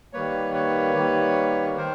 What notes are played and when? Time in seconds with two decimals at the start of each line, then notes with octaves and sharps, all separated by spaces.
0.13 D#3 G3 A#3 B4 C#5
0.54 B4 C#5
0.95 D#3 G3 A#3
1.77 D#3 A#4 C5